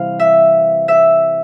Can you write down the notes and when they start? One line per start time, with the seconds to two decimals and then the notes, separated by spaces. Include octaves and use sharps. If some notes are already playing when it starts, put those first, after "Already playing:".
Already playing: C3 E3 G3 F5
0.20 E5
0.88 E5